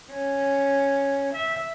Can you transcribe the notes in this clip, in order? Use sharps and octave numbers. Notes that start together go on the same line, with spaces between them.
C#4
E5